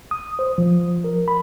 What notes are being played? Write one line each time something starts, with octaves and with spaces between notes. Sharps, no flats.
D#6
C5
F3
A#4
B5